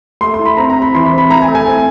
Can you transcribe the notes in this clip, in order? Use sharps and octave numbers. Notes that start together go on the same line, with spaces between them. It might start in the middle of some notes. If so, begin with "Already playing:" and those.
A3 C6
C6
E4
B5
C4 A#5
A#5
C4
B5
E3 C6
B5
C4
B5
E4 A#5
G#5
A3
G#5
C4